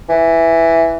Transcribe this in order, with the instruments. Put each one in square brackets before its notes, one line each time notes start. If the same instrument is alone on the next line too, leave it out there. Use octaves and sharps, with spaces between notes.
[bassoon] E3